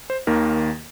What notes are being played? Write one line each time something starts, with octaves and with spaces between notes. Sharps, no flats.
C5
D#2 D#3 A#3 A#4